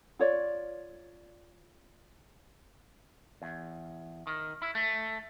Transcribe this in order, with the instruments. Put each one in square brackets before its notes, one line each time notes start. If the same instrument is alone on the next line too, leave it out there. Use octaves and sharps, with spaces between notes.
[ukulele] F4 C#5 D5
[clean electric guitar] E2
D#3
E4
A3